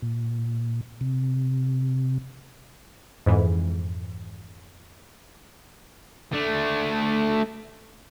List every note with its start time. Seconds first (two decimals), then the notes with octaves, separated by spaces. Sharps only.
0.02 A#2
1.01 C3
3.26 F2 G#2 E3
6.33 A3 D4